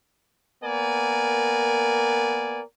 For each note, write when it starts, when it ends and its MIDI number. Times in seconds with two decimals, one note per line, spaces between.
0.63 2.61 58
0.63 2.61 59
0.63 2.61 70
0.63 2.61 74
0.63 2.61 80